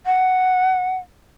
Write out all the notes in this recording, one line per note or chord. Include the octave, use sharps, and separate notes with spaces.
F#5